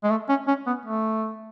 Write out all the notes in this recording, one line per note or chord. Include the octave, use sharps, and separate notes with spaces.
G#3
A3
C#4
C#4
B3
A3